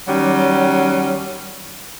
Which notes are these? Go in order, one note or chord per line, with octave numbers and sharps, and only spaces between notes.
D#3 F#3 G3 C#4